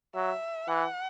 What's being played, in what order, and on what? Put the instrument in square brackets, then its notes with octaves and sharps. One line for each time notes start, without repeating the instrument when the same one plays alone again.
[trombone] F#3 [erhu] E5
[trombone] E3 [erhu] F#5